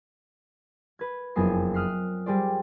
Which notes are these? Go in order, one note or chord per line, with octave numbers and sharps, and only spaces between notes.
B4 G#6
F#1 F2 B3 G#5 D#6 C7
D#6 F6 F#6 B6 C7
G3 G#4 C5 D5